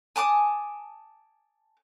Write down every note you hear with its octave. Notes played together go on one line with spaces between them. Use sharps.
G#5 A5 D6 D#6